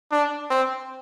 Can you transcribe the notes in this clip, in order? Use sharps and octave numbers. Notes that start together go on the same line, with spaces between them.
D4
C4